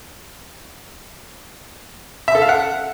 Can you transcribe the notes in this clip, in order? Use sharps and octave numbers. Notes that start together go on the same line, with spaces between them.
E5
A4
F5
F#5